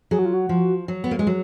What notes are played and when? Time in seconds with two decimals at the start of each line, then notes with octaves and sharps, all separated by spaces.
0.11 F#3 G#4
0.19 F#4
0.25 F4
0.34 F#4
0.49 F3
0.88 F#3
1.04 B3
1.11 A#3
1.19 G#3
1.27 F#3